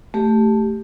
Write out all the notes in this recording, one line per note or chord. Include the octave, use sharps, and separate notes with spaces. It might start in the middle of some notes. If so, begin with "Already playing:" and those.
A3 G4